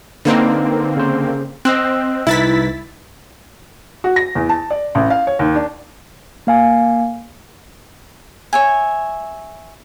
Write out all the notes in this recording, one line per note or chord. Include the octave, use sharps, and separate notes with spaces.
D3 A#3 C4 D#4 B4
C#3 C5
C4 D#5 E6 F#6
C2 D#4 E4 B4 A6 B6
F#4
A#6
E2
A5
D5
A1
F5
C#5
D#2
D4
A#3 F5 G#5
C#5 E5 G#5